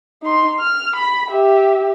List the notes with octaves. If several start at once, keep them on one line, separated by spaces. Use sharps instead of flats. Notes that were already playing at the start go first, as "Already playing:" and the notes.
D#4 C6
F6
B5
G4 E5